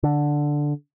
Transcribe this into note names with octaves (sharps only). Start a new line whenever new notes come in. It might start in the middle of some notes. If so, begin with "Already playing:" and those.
D3